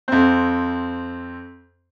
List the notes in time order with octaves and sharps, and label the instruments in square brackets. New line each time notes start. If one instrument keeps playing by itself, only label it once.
[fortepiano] F2 C4